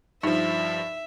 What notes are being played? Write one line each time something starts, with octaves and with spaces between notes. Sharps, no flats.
G2 F3 D#4 E5